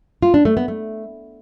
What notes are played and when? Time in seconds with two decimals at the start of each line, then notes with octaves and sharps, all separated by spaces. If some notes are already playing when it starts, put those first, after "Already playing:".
0.23 F4
0.34 D4
0.45 A3
0.57 B3
0.68 A3